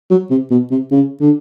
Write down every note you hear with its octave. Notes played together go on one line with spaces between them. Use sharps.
F#3
C3
B2
C3
C#3
D3